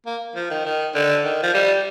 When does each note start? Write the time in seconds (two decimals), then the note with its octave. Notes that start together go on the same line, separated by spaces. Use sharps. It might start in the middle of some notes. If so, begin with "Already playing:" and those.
0.06 A#3
0.35 F3
0.50 D#3
0.65 D#3
0.95 D3
1.24 D#3
1.42 F3
1.54 G3